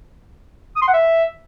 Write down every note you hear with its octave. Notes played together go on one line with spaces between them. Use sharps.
D#6
C6
F#5
E5